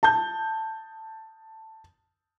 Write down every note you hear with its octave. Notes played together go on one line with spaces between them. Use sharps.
A5 G6